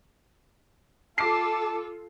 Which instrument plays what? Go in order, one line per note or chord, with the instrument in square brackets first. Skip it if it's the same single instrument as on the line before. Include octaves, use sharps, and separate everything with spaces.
[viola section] F4 A4 [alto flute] A5 [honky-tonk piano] D6 C7